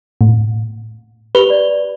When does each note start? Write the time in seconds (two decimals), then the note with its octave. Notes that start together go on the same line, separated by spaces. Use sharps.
0.21 A2
1.35 G4 B4 F7 G7
1.50 D5